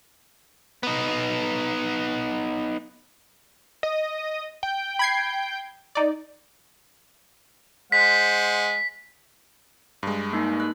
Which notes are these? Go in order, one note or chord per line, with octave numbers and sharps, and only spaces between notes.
B3 D#4
D#5
G5
B5 G#6 C7
D#4 D5
G#3 C5 F#5 B6
G2 G#3
A#3 D#4
F#6